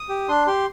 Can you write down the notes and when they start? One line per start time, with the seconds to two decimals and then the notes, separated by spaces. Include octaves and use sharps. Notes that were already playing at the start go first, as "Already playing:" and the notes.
Already playing: D#6
0.09 G4
0.28 D4 C6
0.47 G4 C6